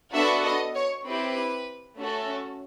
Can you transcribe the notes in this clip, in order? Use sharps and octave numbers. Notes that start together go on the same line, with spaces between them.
B3 D4 F#4 A4 E5
D#5
C#5
C4 E4 G4 B4
A3 C#4 F#4 A4